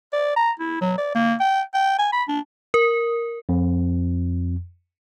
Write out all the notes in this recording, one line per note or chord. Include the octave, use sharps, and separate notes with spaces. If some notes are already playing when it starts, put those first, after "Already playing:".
D5
A#5
E4
F#3
D5
A#3
G5
G5
G#5
B5
D4
A#4
F2